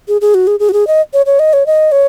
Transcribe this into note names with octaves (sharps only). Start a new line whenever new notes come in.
G#4
G#4
F#4
G#4
G#4
F#4
G#4
D#5
C#5
C#5
D#5
C#5
D#5
C#5